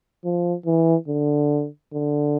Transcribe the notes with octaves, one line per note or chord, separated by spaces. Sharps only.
F3
E3
D3
D3